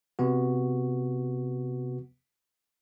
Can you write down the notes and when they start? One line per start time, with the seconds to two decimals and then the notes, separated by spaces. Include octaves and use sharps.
0.19 C3 B3 F#4